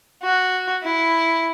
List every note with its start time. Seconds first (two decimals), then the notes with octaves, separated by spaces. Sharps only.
0.23 F#4
0.83 E4